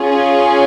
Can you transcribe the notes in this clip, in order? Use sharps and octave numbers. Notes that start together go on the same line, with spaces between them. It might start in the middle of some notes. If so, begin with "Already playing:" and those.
Already playing: C#4 F4 G#4